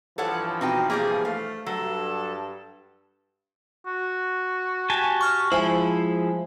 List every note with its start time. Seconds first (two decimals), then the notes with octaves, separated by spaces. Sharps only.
0.18 G2 E3 F3 A4 C#5 F#5
0.61 B2 C4 D#4 G5
0.90 B2 G3 A#3 G#4
1.25 A3 F5
1.66 G2 F#3 A4
3.86 F#4
4.90 G4 G#5 A5
5.21 C#6 F6
5.52 F3 G#3 E4 C5 E5 G#5